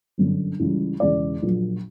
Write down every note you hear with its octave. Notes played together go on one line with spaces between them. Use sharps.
G1 F#2 D3
C#2 C#3 E3 G3
E1 E2 C#3 D5
A#1 A#2 F#3